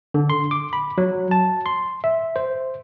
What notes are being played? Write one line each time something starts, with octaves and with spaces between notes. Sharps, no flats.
D3
C6
D6
B5
F#3
A5
C6
E5
C5